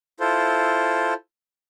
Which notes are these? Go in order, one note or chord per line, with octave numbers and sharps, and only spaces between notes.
E4 F4 A4 C5